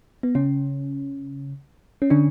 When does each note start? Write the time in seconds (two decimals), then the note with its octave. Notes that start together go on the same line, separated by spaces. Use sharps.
0.23 B3
0.35 C#3 C#4
2.02 C#4
2.10 D3 D4